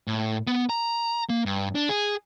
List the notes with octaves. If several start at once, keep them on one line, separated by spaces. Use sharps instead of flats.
A2
B3
A#5
A#3
G2
D4
G#4